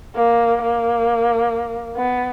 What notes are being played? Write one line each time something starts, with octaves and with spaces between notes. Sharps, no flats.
A#3
A#3
B3